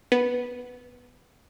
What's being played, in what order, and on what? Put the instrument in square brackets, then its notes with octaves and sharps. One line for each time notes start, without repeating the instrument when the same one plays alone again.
[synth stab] B3